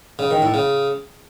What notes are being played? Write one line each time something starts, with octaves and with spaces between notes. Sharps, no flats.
C#3
D#3
A2
C#3